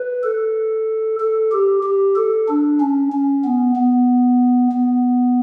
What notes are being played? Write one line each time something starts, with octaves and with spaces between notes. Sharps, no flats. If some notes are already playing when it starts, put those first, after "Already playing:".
Already playing: B4
A4
A4
G4
G4
A4
D4
C#4
C#4
B3
B3
B3